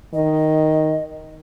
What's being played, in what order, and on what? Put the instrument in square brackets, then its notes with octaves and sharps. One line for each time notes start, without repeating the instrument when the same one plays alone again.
[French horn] D#3 [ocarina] D#5